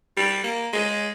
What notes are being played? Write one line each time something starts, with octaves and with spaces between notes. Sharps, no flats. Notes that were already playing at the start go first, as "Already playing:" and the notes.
G3
A#3
G#3